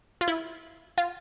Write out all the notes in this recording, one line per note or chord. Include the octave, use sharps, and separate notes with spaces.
F4
E4
F4